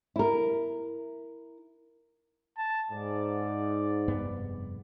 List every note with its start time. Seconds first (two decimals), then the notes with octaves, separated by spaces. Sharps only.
0.16 E4 A#4
2.57 A5
2.91 G#2 D5
4.08 F1 G2 B3